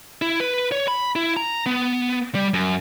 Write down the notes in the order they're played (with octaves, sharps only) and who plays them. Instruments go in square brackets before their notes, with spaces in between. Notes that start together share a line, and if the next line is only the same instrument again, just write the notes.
[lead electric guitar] E4
B4
C#5
B5
E4
A#5
B3
G3
F#2